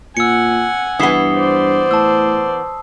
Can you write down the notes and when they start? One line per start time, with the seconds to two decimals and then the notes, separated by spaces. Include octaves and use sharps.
0.17 A#2 F#5 G#5 E6 C#7
0.99 G2 E3 B3 D#6 C7 G7
1.35 C5 D5
1.91 A2 A5 E6